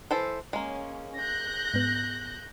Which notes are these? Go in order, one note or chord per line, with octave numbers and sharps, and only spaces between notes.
E3 A4 C5
G#3 A#3 C#4
F#6 G6 A#6
G#2 B3